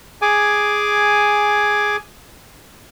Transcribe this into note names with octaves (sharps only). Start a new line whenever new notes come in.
G#4 G#5 D6